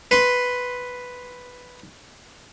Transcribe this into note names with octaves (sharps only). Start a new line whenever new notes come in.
B4 C6